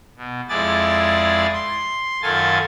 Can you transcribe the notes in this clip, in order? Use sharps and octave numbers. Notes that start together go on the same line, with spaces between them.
B2
F2 G#3 E4 G#4 D5 A6
C6
F#2 D#3 F4 A4 G#5 A6